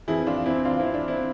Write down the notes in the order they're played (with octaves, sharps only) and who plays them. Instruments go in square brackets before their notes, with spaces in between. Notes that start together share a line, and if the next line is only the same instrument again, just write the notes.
[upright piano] F2 E3 E4 G#4
D4 F4
C4 E4
F2 E3 D4 F4
C4 E4
D4
C4 E4